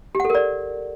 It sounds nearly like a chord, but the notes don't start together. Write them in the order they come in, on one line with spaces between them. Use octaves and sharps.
G4 F#5 A4 A#4 D5